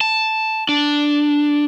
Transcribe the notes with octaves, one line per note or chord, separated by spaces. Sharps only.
A5
D4